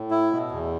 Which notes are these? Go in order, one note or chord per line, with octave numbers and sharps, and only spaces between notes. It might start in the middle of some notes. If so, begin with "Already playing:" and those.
Already playing: A2
E4
B2
E2